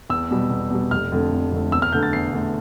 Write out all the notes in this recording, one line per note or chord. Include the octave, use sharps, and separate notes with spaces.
E2 E6
B2 G3
E2
B2 G3
F1 F6
F2 D3 A3
F1
F2 D3 A3
E2 E6
F6
D3 A3 G6
A6
E2 C7
D3 A3